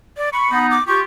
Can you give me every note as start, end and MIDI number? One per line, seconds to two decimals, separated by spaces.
0.17 0.29 74
0.33 0.67 83
0.33 0.45 85
0.51 0.75 59
0.51 0.75 63
0.71 0.85 86
0.87 1.01 65
0.87 1.01 67
0.87 0.99 85